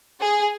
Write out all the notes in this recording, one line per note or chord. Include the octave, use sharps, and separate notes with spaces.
G#4